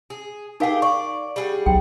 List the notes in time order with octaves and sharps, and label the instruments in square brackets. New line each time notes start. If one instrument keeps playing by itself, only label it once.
[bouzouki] G#4
[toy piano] D#4 A#4 F5 [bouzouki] G4 G#4
[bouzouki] D5 [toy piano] C#6
[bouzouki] G3 G#4 F#5
[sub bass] B1 [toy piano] G5